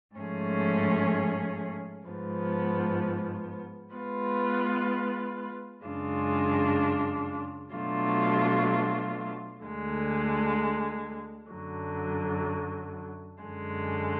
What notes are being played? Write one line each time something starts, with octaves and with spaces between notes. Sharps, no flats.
G#2 F3 A3 C#4 G#4
G#2 F3 B3
G#3 B3 F4 B4
F#2 C#3 G#3 D4 F4
B2 F#3 A3 D4 F4
D2 D3 G#3
F#2 D3 F#3
F#2 D3 G#3